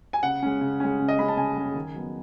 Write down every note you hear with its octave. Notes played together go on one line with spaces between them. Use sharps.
G#5
C#3 F#5
G#3 C#4
C#3
G#3 C#4
C#3
D#5
G#3 C#4 B5
A5
C#3 G#5
G#3 C#4
D#3
F#3 B3